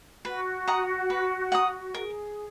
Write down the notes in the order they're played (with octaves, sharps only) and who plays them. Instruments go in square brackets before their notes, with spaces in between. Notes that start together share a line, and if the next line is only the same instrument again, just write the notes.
[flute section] F#4 [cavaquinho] B4
[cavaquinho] F#5 A#5 D#6
B4
F#5 A#5 D#6
[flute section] G#4 [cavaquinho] A#4